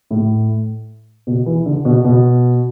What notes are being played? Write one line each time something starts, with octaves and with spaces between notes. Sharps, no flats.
A2
B2
E3
D3
B2
B2